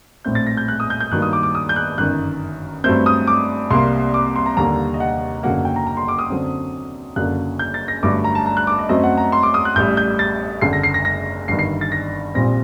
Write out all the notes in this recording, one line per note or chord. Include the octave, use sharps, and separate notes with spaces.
A#1 A2 A3 C4 G6
A6
A#6
G6
F#6
D#6
G6
G6
G2 D#3 F#3 A#3 F#6
D#6
D6
D6
D#6
G6
F#6
G1 F#2 D#3 F#6
G2 F#3 A3 C4 G6
D#6
D6
C2 C3 G3 A#3 C6
D6
C6
A#5
D#2 D3 G3 A#3 A#5
D#5
F#5
F#1 F#2 D3 F#3 A#3 F#5
G5
A#5
A#5
C6
D6
D#6
F#2 D3 F#3 C4
F#1 F#2 D3 F#3 A#3 F#6
G6
A6
A#6
G1 G2 F#3 A3 D6
A#5
A5
A#5
F#6
D6
D#5
F#2 F#3 A3 C4 D#5
F#5
A#5
C6
D6
D#6
F#6
A1 A2 G3 G6
G6
A6
F#1 F#2 D3 C7
A#6
C7
A#6
A#6
G1 G2 D#3 C7
C7
A6
A#6
A#1 A#2 G3 C4 A#6